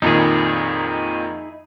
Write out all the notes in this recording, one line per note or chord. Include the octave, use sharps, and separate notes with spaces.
F2 A#2 D#3 D#4 E4 G#4